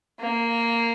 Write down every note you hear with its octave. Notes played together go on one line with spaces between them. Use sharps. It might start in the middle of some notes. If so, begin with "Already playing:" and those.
A#3